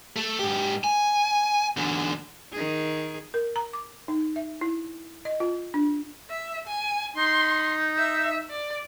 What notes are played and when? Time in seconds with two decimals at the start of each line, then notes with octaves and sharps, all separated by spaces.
0.16 A3
0.39 G#2 G4
0.84 G#5
1.77 E2 D3
2.52 D#3 G#4
3.34 A#4
3.56 A#5
3.73 D6
4.08 D#4
4.36 E5
4.61 E4
5.25 D#5
5.40 F4
5.74 D4
6.30 E5
6.67 G#5
7.16 D#4 C6
7.98 E5
8.50 D5